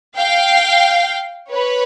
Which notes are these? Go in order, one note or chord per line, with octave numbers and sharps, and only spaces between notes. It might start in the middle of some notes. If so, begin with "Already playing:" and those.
F5 G5
B4 C#5